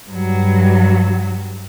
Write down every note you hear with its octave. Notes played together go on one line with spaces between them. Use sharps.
G2 F#3